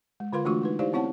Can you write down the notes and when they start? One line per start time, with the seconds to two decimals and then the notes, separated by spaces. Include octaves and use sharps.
0.20 G#3
0.33 D3 F4 A#4 B4 F5 C6
0.45 E3 A3 D4 F4 F#4 C#6
0.62 G#3 D#4 B4
0.79 D#4 E4 G4 C5 D5 F5
0.93 B3 C4 E4 C#5 F#5 A5